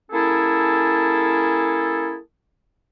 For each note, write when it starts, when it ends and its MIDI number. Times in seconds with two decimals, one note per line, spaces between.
0.12 2.16 58
0.12 2.16 61
0.12 2.16 64
0.12 2.16 68
0.12 2.16 69